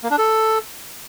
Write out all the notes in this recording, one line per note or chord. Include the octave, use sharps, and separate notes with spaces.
A#3
D4
A4